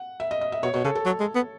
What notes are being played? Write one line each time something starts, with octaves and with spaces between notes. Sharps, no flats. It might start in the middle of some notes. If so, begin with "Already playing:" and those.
Already playing: F#5
E5
D#5
D#5
E5
B2 C#5
B2 C#5
C#3 A4
A4
F#3
G#3
B3